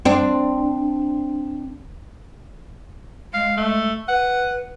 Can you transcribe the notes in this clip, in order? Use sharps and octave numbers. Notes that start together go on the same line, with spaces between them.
C4 D4
G#3 F5
A3
B4 F#5